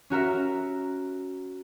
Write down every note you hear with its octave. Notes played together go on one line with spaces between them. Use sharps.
C#4 F#4 A#4 E5